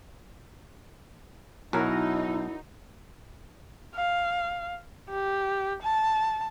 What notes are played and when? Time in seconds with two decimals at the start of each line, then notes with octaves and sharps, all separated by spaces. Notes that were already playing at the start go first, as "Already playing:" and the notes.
1.73 B1 D#4 E4 F#4 A#4 C#5
3.95 F5
5.10 G4
5.82 A5